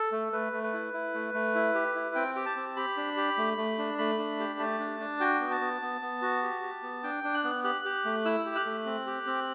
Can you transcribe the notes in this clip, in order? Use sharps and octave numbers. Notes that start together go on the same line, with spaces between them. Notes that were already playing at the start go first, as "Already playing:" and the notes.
Already playing: A4
A3
A3 B4
A3
B4
E4
E4
A3
A3
E4
G4
E4
C4 G5
G4 G5
A5
C4
G4 B5
D4
G4
A3
A3
D4
A3 B5
D4
G4
A3 A5
D4
D4
F#4 G5
B3
A5
B3
B3
B3
F#4
G4
G4
B3
D4 G5
D4
F#6
B3
G4 F#6
G4
A3
E4 E6
G4
F#6
A3
C4
G4
C4